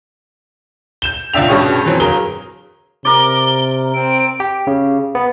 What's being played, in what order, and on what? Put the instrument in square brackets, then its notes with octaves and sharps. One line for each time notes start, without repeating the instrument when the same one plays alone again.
[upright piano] G6 E7 G7
C#2 A#2 D4 E5 G5 F7
G2 B2 C#4 G4 G#4 C#6
B2 E3 F#3 C4
G1 F#3 G#4 A#4 G7
[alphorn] C3 [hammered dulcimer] A#4 D5 [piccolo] G7
[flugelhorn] C4 [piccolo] D7
[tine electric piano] G4
C#3
B3